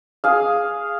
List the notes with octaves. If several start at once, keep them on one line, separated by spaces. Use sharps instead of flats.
G#4 F5